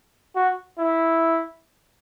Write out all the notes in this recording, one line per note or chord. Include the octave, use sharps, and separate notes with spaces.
F#4
E4